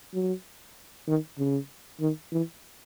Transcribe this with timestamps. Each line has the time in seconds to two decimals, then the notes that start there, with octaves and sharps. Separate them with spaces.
0.14 F#3
1.08 D#3
1.39 C#3
2.01 D#3
2.32 E3